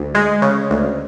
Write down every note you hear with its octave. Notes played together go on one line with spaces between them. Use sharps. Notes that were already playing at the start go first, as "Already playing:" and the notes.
Already playing: D2
G#3
C#3
D2